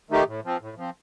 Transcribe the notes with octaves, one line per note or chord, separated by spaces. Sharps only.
D#3 A3 D#4 G4
A2
F3 C4
A2
F3 C4